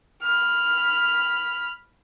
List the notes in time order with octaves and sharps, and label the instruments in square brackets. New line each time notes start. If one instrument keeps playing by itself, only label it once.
[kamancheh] B5 F6